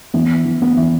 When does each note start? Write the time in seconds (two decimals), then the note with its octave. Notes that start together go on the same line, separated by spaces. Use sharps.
0.14 E3 B3
0.45 E3
0.62 B3
0.77 E3